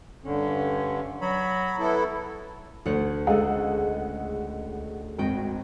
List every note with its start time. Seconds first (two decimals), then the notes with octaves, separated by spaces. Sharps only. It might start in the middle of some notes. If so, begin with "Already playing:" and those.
0.24 G2 D3 C#4
1.21 F#3 B5
1.78 B3 E4 A4
2.85 D2 C#5 F#5
3.27 C#2 G#3 G#4 A4 F#5
5.19 G#1 F#4 D#5 G5